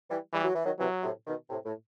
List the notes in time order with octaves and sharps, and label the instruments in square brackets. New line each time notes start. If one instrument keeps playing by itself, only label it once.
[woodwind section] E3 G3
[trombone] E3 [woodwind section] G3
[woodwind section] F#3
E3
D#3 F#3
[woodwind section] C3 E3 [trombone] F#3
[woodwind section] A2 C3
B2 D#3
A2 C3
A2